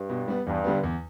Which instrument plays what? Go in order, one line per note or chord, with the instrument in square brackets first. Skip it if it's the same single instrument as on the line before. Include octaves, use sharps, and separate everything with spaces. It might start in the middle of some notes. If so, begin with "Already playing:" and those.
Already playing: [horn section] G2
[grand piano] B2
G3 B3
[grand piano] E2 [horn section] G2
[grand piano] D3 G3 B3
E2